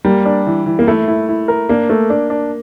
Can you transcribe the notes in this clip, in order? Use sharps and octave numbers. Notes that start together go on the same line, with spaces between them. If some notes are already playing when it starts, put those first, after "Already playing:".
G3 A#3
D4
E3
E3
A#3
A3 E4
E4
E4
A#4
A#3 D4
A3
D4
D4